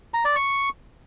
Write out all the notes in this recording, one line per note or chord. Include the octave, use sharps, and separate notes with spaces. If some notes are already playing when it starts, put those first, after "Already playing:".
A#5
D5
C#6